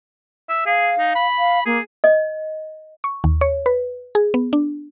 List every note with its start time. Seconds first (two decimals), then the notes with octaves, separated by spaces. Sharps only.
0.49 E5
0.66 G#4 F5
0.99 D#4
1.15 B5
1.38 F5
1.66 A#3 G#4
2.04 D#5
3.04 C#6
3.24 D#2
3.41 C#5
3.66 B4
4.15 G#4
4.34 B3
4.53 D4